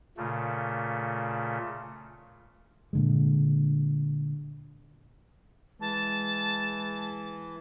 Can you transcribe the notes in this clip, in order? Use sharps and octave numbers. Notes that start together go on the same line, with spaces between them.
A#2 C#3 A3
A#2 D3 G#3
E3 G#3 A5